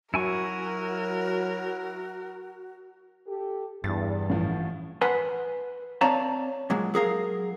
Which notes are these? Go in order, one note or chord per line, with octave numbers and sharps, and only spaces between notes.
F#3 E4 F#4 A#4 G#5 C#6
G4 A4
E2 G2 A6
A1 A2 F3
B4 F#5 G#5 C6
C4 C#5 D5 F5 A5 A#5
A#2 F#3 G#3
F#3 G#4 A#4 F5